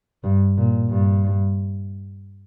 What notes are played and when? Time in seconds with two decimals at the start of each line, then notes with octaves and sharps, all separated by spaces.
0.24 G2
0.58 A#2
0.90 G2